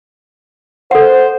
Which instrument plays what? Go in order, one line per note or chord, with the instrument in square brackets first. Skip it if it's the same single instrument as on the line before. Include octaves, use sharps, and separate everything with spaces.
[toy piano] A4 F#5 [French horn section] C5